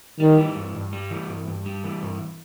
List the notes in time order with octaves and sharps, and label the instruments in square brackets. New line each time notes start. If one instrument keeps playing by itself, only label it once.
[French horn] D#3 [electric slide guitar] G3
[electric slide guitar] E3
G2
G2
G3
E3
G2
G2
G3
E3
G2